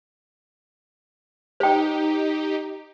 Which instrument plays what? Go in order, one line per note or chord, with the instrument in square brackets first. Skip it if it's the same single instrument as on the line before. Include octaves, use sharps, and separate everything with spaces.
[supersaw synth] D#4 G4 [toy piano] C5 G5